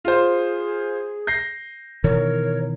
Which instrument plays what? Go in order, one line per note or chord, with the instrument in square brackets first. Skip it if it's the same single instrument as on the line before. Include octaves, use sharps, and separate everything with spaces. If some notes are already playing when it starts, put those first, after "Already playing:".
[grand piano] F4 C5 [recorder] G#4
[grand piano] G6 A#6 C7
[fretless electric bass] B2 D#3 E3 [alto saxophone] A#4 [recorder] C#5